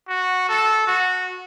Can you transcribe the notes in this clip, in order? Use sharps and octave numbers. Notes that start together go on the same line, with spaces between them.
F#4
A4
F#4